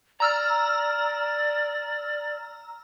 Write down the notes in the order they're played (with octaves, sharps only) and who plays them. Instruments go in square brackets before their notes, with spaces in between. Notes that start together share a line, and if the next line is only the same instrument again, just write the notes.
[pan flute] D5 [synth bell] A#5 E6 F6